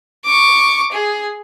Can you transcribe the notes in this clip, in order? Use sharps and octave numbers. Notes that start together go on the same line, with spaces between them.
C#6 D6
G#4